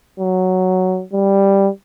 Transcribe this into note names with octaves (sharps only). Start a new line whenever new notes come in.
F#3
G3